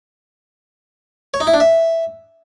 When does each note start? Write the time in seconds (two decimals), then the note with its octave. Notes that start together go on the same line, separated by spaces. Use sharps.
1.34 C#5
1.40 D#4
1.47 E4
1.54 D4
1.60 E5